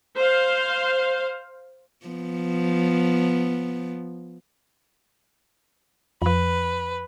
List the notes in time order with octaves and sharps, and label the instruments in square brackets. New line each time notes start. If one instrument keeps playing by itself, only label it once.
[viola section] C5 F5
[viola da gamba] F3 B3
[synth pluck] F2 F3 [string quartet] B4